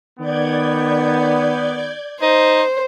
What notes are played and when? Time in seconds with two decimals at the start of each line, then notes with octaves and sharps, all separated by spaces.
0.19 D#3 B3 D5 G6 G#6
2.22 D#4 C5